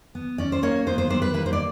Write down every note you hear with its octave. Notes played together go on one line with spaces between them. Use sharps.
B3
C#4 D5
C5
A#3 C#5
B3 C5
C5
G3 C5
B4
A#3 B4
C5
D5